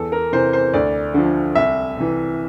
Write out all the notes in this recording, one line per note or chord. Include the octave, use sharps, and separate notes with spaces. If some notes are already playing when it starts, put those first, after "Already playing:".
Already playing: E2 A4
A#4
C3 E3 C5
C5
D2 D5
D3 F3
C2 E5
C3 E3